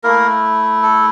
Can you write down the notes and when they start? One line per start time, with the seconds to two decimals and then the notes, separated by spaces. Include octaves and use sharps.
0.04 A3 A#3 E4 A#4
0.82 A4